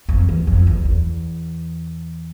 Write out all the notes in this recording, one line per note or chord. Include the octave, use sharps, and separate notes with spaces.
F2
E2
F2
E2
E2